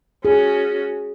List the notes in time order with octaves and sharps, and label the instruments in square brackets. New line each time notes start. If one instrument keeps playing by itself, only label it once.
[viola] C#4 F#4 [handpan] G#4